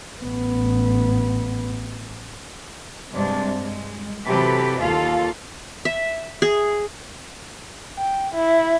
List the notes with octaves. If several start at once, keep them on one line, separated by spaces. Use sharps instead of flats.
A1 B3
G2 C3 G#3 D4
G#3
C3 E3 F#3 G4 A4 B4
D#2 F4 A4 F5
E5
G#4
G5
E4